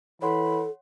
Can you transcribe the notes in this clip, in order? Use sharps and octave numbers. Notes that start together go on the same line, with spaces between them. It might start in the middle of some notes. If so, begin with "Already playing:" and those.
E3 A4 C#5 F#5 B5 C6